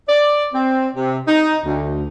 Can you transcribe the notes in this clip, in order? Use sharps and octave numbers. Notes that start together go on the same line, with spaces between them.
D5
C4
C3
D#4
D2